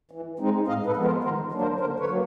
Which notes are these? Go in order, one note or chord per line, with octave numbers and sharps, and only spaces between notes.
E3
G#3 C4 D#4
A2 D#5 F5
A4 B4
F3 G#3 B3
A#4 C5
D#3 A#4 C5
F#3 A#3 D4
A#4 C5
D3 A#4 C5
B4 C#5
F#3 A#3